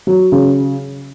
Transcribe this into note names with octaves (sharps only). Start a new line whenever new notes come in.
F#3
C#3